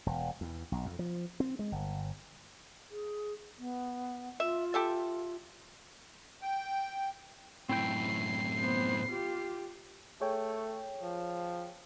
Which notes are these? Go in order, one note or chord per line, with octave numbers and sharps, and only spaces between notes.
E1
E2
B1
F2
F3
C4
G#3
G1
G#4
B3
F4 E5
G4 A4 E5
G5
F#2 A2 C4 E4 G5 C7
B3 C5
F4 G4
A3 G#4 C#5 G5
F3